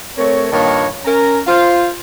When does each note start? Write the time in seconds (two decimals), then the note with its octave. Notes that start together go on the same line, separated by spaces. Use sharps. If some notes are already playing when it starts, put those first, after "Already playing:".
0.18 A3 C4 A#4 C#5
0.52 G2 A#2 D#3 A#3 C#5 A5
1.05 C#4 A#4 A#5
1.47 F4 C5 F5